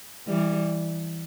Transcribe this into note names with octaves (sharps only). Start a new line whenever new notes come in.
E3 G3